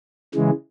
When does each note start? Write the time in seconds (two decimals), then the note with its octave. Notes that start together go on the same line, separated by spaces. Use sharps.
0.35 C#3 E3 G#3